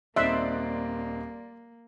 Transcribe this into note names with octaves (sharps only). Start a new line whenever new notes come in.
D#1 A#3 C4 D#4 D5 E5 C6 F#6